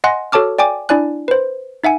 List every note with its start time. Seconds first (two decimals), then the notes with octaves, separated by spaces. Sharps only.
0.04 D#5 F#5 G#5 C6 F#6 A#6
0.32 F#4 A4 C#5 A5 D6 F6
0.58 D5 G5 G#5 D6
0.89 D4 E4 D5 G#5 F#6
1.28 B4 C5
1.84 D#4 E5 F#5 G#5